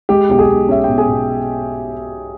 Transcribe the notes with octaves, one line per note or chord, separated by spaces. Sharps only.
G#3 G4
B1 G4
G#4
B1
C#4 E5
B2 G5
G#4 G#5
B2